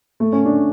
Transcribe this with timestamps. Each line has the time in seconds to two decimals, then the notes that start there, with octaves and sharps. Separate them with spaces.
0.20 A3
0.33 C#4
0.45 D4